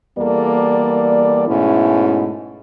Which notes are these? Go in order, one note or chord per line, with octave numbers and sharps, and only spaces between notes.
E2 G3 A#3 A4 D5
G#2 B2 G#3 A3 C#4 E4